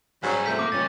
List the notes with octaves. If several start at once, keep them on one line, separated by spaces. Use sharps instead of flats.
G#2 F#3 G3 C#4
C3 F3 A3 G6 B6
A#3 D6
G2 A#2 A#3 C#4 A6